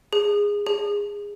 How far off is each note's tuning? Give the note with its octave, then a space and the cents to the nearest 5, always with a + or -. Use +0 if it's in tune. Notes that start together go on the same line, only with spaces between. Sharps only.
G#4 -15
G#4 -20